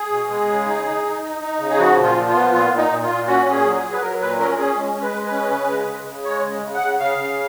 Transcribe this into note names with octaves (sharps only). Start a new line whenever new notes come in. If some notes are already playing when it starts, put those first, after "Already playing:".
Already playing: G#4
B2
G#3
C#3
D#4
D#4
D#4
D#4
D#4
C#3
G#4
F3 F#4
A#2
F4
F3
F4
B3
A#2 F4
A#2
D#4
A#2
F4
A#2
C#4 F#4
A#2
G#4
F#3
G#4
F#3
B4
F#3 A#4
A#2 B4
C#4 A#4
C#4 G#4
G#3
G#3
B4
G#3
B4
C#4
C#3
G#3
C#3
C#3
G#3 C#5
C#3
C#3
F#5
C#3
C#3 F5
C#3